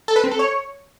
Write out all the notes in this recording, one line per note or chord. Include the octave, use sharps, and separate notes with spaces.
A4
B4
C4
A4
C#5